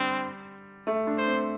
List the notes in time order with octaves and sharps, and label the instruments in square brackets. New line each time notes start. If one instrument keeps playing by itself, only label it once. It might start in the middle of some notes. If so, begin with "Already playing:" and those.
Already playing: [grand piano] D3 G3 [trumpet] C4
[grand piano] A3
D4
[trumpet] C5
[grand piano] C4